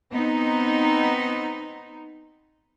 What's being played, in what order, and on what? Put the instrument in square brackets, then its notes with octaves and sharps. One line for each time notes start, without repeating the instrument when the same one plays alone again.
[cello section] B3 C4 D#4